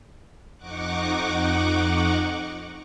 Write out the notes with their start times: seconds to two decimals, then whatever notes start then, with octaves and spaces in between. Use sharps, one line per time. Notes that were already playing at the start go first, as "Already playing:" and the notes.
0.58 F2 D#4 F#5 C#6 D6 F#6